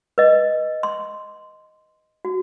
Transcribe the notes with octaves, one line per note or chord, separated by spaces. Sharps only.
B4 D#5
C6
F#4